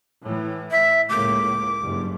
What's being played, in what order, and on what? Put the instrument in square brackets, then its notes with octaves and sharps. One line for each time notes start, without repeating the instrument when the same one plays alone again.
[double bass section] A2 E3
[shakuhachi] E5
[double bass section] C#2 A2 A#3 [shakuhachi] D6
[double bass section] F#1 G2